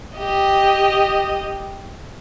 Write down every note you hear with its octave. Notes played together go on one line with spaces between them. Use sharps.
G4 D#5